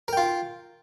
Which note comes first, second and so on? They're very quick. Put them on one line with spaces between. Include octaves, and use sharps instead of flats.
A#4 G5 F4